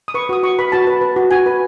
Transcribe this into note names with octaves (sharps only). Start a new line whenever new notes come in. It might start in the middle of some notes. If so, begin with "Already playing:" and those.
D#6
B4 C#6
F#4 D#6
F#4 C#6
B4 B5
F#4 A5
B4
B4
F#4
F#4 G#5
B4